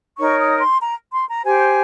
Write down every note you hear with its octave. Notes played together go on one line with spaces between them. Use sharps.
D#4 A#4 C#5 C#6
D#6
C6
A#5
C6
A#5
G4 C5 G#5